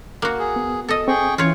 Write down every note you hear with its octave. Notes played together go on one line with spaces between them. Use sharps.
A#3 F#4
G#4
B3
A4 D#5
C4 G#4 G5 C#6
E3 C#4 F4 C#5